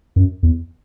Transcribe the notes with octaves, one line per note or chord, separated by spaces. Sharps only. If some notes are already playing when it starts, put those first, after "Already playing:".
F#2
E2